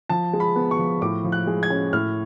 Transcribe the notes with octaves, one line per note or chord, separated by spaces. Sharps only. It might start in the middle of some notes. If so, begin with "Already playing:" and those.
F3 A5
G#3
B5
B3
C#6
F3
A2 D6
F3
F#6
G#3
G#6
C#4
A2 F6